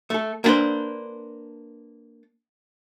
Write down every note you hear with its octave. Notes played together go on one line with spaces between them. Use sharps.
A3 A4
A#3 B3 D4 B4 C5